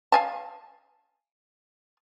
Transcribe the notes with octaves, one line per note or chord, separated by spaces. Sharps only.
F5 G#5 A5